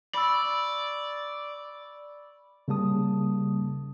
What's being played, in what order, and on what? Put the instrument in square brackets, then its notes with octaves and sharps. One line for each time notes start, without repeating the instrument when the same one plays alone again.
[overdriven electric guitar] D5 [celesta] B5 C#6 E6
[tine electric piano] C#3 G3 A#3 A5 D#6